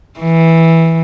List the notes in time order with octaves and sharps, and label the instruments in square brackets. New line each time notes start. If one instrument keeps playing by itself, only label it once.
[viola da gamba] E3